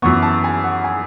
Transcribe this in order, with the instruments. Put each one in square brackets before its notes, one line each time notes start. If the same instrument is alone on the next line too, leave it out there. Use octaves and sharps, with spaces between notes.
[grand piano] F#2 E3 B3 [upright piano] C#6
[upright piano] A5
G#5
F#5
G#5